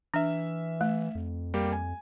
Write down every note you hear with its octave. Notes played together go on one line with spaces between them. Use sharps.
E3 D4 E5 F6
A3
F2
G3 A#3 G4
G#5